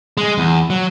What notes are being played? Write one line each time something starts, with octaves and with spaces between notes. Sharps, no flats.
G#3
E2
F#3